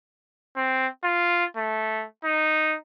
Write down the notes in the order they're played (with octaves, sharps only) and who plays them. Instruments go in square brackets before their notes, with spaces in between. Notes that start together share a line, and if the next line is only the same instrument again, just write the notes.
[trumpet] C4
F4
A3
D#4